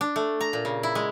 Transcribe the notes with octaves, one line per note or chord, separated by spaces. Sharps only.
D4
A3
A#5
A#2
C#3
E4
G#3